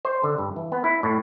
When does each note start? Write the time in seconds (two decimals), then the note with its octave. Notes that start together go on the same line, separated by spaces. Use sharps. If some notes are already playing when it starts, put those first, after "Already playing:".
0.05 C5
0.24 D3
0.38 G2
0.56 E3
0.72 B3
0.84 E4
1.03 A2